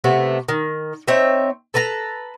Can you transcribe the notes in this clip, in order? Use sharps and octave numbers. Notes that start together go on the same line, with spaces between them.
C3 A3 B3
D#3
C4 D#4 C#5 E5
A4 B4 A5 A#5